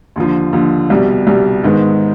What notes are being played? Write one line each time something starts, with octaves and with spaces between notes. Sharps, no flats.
D#2 D3 F3
D#2 D3 F3
C2 B2 G3
C2 B2 G3
G#2 D#3 G#3 B3